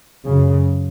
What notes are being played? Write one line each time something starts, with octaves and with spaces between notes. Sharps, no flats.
F#2 C#3